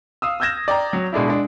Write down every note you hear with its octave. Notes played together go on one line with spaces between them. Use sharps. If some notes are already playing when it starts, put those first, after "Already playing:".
F5 D#6 E6
E6 F6 G6 G#6 A#6 E7
D5 G5 A#5
F#3
B2 G#3 D4 E4
G#3 D4